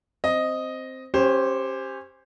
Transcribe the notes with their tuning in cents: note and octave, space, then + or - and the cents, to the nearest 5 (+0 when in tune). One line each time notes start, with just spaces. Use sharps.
C4 +0 D#5 +0
C#4 -25 G4 +0 C5 +0